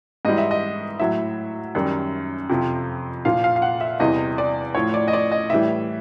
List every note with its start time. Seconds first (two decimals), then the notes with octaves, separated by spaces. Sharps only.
0.25 G#2 E3 G3 D#5
0.38 E5
0.51 D#5
1.00 A2 F#3 E5
1.75 F#2 D#3 G3
2.50 F2 C3 F3
3.25 A#2 F3 F5
3.44 F5
3.56 F5
3.62 F#5
3.81 E5
4.00 E2 C3 E3 G3 D#5
4.38 D5
4.75 A2 F3 C#5
4.94 D5
5.08 D#5
5.13 D5
5.31 D#5
5.50 A2 E3 G3 E5